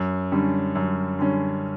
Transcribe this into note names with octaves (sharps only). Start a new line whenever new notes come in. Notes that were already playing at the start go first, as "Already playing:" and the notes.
Already playing: F#2
D3 G3 C#4
F#2
D3 G3 C#4